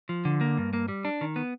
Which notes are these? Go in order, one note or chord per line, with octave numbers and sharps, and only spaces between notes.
F3
D3
A#3
G2
A#3
G3
D4
D#3
B3